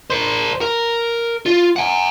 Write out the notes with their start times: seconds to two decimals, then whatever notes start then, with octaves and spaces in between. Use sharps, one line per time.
0.10 A#4 C5
0.61 A#4
1.46 F4
1.76 F#5 G#5